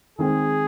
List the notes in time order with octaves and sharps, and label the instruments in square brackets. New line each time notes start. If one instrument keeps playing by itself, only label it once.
[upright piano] D#3 G#3 C4 [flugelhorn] G#4